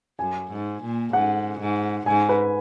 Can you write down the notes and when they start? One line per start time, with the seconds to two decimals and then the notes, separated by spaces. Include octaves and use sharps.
0.19 F#2 G#5
0.51 G#2
0.82 A#2
1.13 G#2 F#5
1.60 G#2
2.06 G#2 G#5
2.29 B4